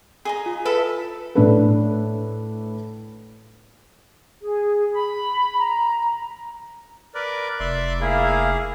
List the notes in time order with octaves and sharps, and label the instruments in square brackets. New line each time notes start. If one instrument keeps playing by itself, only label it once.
[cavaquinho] G#4 D#5 A#5
[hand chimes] F4
[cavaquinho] E4 A4 E5 [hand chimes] B4
[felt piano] A2 D4 B4
[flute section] G#4
B5
A#5
[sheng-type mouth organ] A#4 B4 D5
[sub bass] F1 [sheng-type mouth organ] D5 E5 C6
[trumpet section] A#3 E5 F5 [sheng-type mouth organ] E4 G#4